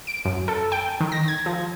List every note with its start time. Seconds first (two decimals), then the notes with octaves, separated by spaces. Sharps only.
0.07 D7
0.25 F#2
0.48 A4
0.72 G5
1.00 D#3
1.12 A#6
1.28 G#6
1.46 F3